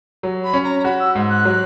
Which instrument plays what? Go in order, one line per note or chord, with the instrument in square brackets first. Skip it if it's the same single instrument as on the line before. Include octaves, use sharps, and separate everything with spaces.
[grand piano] F#3
[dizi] B5
[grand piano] C#4
[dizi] A#5
A#5
[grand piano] F#4 [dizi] B5
[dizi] E6
[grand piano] G#2
[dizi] F#6
[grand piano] F#3